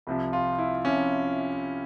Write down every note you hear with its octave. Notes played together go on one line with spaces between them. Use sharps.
C2 C3 F3
F4
E4
C3 F3 C#4